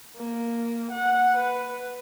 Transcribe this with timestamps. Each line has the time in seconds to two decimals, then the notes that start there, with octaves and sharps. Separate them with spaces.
0.17 A#3
0.91 F#5
1.35 B4